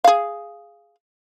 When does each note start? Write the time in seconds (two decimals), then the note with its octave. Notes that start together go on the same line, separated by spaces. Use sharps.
0.04 G#4 F5